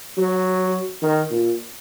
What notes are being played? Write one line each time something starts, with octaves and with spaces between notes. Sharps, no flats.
F#3
D#3
A#2